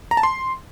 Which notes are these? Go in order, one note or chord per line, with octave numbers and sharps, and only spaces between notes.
A#5
A5
C6